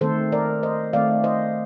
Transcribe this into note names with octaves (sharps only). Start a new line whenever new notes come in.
D#3 A3 C4 A4 C5
A#4 D5
C5 D#5
D#3 A3 C4 D5 F5
C5 D#5